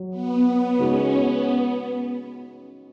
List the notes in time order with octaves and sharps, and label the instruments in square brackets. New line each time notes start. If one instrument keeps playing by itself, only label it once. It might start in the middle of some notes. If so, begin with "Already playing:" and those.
Already playing: [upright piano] F#3
[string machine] B3
B3
[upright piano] C#3 G#3 D#4 F#4 [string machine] C#4
[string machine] B3